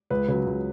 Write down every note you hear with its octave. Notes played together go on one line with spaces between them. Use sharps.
C#2 B4
C#3 F#3
C#2